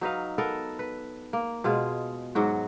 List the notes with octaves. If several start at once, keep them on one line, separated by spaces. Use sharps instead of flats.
F#3 D#4 B4 F5
B3 A4 A#4
B4
A#3
B2 G#3 F4 G#4
G#2 F#3 F#4